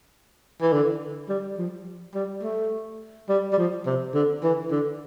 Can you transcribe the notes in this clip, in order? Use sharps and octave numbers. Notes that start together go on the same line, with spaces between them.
E3
D3
G3
F3
G3
A3
G3
G3
F3
C3
D3
E3
D3